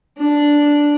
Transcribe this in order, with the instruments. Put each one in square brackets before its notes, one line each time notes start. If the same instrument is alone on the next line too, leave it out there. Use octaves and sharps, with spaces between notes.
[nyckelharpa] D4